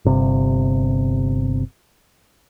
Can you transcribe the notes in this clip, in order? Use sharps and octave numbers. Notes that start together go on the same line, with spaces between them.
G1 C3